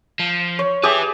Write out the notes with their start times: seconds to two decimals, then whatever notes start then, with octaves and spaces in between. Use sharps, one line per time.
0.19 F3
0.59 C#5
0.83 G4 G#4 B4 E5 D6